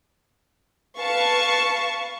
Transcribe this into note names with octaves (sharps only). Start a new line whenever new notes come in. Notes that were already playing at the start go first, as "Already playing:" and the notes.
B4 F5 A5 C#6